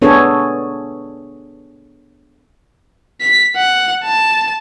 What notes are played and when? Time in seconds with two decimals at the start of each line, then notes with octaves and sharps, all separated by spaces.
0.02 B3 D4 G#4 A4 C#5
3.21 B6
3.56 F#5
4.04 A5